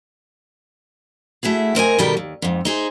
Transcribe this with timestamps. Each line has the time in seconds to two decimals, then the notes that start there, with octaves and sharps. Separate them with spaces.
1.43 A3 E4 F#4 G#4
1.75 C4 A#4 D#5 G#5
1.99 B2 D#3 G3 A4 A#4 G5
2.17 D#2
2.42 F2 G#2
2.65 D#4 G#4 C5